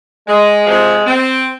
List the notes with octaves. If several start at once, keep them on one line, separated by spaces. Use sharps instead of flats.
G#3
C3 F3 G#3
C4